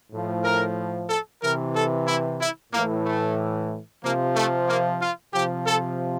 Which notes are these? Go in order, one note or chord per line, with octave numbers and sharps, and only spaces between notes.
A2 F3
A#4
A4
C3 E3 A#4
A4
E4
E4
A2 E3 A#3
A3
C3 F3 A#3
A3
A#3
F4
C3 F3 G4
A4